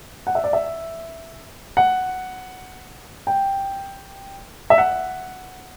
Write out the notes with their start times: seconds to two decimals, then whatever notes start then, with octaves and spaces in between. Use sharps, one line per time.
0.27 F#5
0.35 E5
0.44 D5
0.53 E5
1.77 F#5
3.27 G5
4.70 E5
4.78 F#5